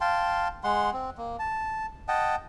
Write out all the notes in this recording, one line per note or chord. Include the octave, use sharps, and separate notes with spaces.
F5 G5 A5 C6
G#3 F#5 C6
C4
A#3
A5
D#5 F#5 G5 A5